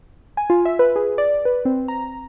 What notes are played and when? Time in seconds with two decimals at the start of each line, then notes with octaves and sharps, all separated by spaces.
0.37 G#5
0.50 F4
0.65 E5
0.79 B4
0.96 G#4
1.18 D5
1.45 B4
1.65 C4
1.88 A#5